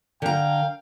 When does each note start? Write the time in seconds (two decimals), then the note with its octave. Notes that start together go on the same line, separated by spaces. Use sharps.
0.22 D3 F5 G5 A#5